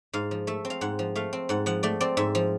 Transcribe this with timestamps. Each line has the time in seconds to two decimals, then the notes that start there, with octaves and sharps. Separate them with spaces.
0.13 G#2 F5
0.31 F3
0.47 A3 E5
0.65 C4
0.70 F5
0.81 G#2 F#5
0.99 F3
1.16 A3 F5
1.33 C4
1.49 G#2 F#5
1.66 F3 F#5
1.83 A3 D5
2.01 C4 D5
2.17 G#2 E5
2.35 F3